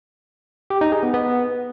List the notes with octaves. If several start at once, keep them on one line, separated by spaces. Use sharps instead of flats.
G4
D#4
G#4
B3
B3